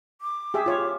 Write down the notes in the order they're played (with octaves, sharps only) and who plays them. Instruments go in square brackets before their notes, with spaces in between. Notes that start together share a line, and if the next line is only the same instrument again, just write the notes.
[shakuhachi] D6
[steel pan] G4 G#4 E5
F4 C#5